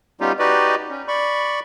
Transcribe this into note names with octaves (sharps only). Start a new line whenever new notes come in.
G3 B3 C#4 D#4 F4 G4
D#4 F#4 G4 B4 D5 D#5
C#4
D5 B5 C#6